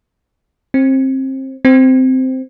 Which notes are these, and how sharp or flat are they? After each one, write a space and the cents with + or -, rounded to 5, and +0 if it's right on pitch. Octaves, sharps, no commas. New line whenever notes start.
C4 +25
C4 -10